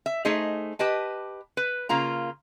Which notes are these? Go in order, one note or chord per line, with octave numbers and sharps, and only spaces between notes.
E5
A3 D#4 G#4 C5 D#5
G4 B4 D#5 A5
B4
C#3 A#3 F4 A#5